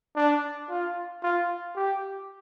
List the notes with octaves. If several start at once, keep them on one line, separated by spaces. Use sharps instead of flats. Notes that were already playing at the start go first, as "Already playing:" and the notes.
D4
F4
F4
G4